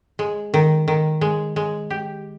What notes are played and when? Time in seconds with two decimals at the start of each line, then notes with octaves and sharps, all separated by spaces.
0.19 G#3
0.54 D#3
0.88 D#3
1.21 G#3
1.56 G#3
1.90 G4